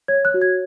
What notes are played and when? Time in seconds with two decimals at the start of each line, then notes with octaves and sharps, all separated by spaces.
0.08 C#5 G#6
0.25 F#6
0.34 F#4
0.42 G#6